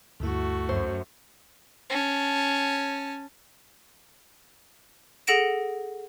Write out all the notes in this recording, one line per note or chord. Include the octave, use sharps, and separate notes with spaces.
D2 G2 A3 E4 F#4
F#2 C5
C#4 A5
G#4 A4 F#5 A#6 D7 E7